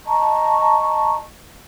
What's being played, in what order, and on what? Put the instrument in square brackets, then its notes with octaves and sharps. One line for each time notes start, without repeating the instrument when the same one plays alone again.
[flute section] D#5 A5 A#5 C#6